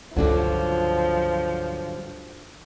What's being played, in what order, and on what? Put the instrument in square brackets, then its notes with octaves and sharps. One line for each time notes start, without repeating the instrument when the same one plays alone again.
[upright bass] C#2 F4 [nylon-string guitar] G2 D3 F#3 [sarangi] F3